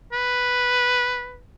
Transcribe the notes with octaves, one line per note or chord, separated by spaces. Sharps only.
B4